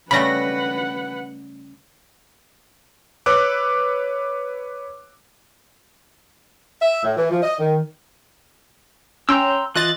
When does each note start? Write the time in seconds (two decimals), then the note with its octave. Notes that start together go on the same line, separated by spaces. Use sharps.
0.11 C#3 G3 A3 B4 F#5 B5 A#6
3.26 B4 C#5 D6 E6 F#6
6.81 E5
7.02 A2
7.16 E3
7.30 F3
7.42 D#5
7.59 D#3
9.29 C#4 G5 A#5 C6 E6
9.76 E3 F4 D#5 F#6 A6